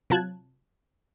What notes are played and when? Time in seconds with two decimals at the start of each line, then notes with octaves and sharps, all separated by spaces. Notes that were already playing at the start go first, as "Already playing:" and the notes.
0.10 C3 F#3 F4 A5 F#6 G#6